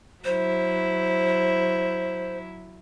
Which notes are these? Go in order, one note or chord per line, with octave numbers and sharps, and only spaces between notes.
F#3 E4 C5